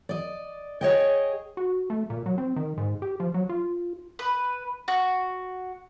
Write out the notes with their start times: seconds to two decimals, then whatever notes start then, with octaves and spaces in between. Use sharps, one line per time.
0.09 D5 D#5
0.81 G#4 C#5 D#5 G5
1.57 F#4
1.90 A3
2.10 A#2
2.26 F#3
2.38 C4
2.56 D#3
2.78 G#2
3.02 G4
3.20 F3
3.34 F#3
3.49 F4
4.19 B4
4.88 F#4